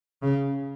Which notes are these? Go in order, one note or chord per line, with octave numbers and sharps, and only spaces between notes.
C#3